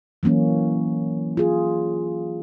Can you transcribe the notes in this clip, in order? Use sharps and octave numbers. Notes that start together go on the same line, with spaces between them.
E3 F#3 A#3 C#4
F4 G#4